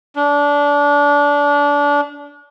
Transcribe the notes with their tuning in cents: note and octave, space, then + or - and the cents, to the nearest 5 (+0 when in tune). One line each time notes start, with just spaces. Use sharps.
D4 -25